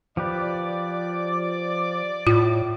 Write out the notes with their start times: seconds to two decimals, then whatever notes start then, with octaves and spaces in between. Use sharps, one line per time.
0.17 F3 G4 B4 D5 D6
2.27 A2 F4